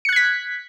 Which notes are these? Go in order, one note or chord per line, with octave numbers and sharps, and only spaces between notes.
F#6 G#6 B6 C#7